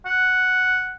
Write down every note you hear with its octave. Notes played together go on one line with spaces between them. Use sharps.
F#5